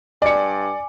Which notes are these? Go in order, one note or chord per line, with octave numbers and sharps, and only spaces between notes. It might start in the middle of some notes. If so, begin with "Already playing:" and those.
G2 D5 G#5 D6 C#7